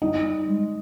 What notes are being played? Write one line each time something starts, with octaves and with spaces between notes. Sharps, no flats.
G3 D#4
G3
G#3